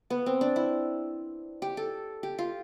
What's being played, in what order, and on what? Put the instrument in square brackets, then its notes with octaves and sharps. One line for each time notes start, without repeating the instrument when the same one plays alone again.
[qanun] B3
C4
D4
E4
G4
A4
G4
F4